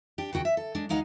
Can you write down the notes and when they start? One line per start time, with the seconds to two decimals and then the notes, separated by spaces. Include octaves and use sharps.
0.18 D4 G4
0.33 D#2 C#3 F#4 G5
0.45 E5
0.57 A4
0.75 G#3 D4
0.89 D2 G#3 D#4 F5 F#5